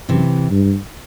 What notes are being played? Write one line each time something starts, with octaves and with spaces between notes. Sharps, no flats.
F#2 C3 E3
G2